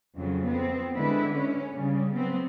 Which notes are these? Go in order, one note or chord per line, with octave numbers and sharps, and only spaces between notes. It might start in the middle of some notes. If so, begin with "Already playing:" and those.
F2 C#3 F#3
B3 C4
D3 G#3 E4 B4
C#4
C#3 G3
F#3 B3 C4